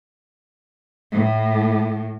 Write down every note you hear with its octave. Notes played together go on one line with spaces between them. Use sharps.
A2